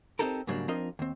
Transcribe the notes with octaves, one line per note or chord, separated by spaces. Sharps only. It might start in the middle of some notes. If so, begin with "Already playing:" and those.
C4 D4 D#4 G4 A4 A#4
G#2 C#3 F#3 G3 A#3 D4
F3 C4 D4 F4 A#4 D#5
D#2 C4